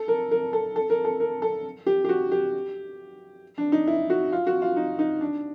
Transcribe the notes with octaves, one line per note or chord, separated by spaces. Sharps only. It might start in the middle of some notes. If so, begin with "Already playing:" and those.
Already playing: A4
A#4
A#4
A4
A4
A#4
A4
A#4
A4
G4
G4
F#4
G4
D4
D#4
E4
F#4
F4
F#4
F4
D#4
D#4
D4